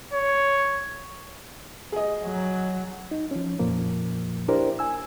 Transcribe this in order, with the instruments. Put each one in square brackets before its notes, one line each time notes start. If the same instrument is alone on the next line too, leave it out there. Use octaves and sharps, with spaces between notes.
[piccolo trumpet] C#5
[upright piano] G#4 D#5
[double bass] F#3
[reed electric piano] D#4
F3 C#4
F2 A#2 F3 A#3
D4 E4 G4 A#4 C5 D5
G#5 E6